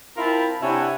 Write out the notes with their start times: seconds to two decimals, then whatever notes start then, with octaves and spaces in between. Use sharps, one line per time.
0.17 C4 E4 F4 A#4 A5 B5
0.62 C3 D4 E4 C#5 F#5 G#5